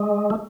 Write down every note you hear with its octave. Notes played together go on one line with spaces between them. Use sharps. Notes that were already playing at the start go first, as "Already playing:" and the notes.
Already playing: G#3
A3